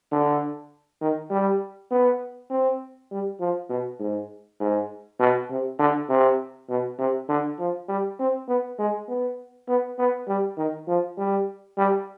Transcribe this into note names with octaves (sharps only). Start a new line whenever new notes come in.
D3
D#3
G3
B3
C4
G3
F3
B2
G#2
G#2
B2
C3
D3
C3
B2
C3
D3
F3
G3
C4
B3
G#3
B3
B3
B3
G3
D#3
F3
G3
G3